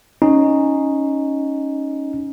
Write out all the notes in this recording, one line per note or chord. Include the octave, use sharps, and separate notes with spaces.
C#4 D#4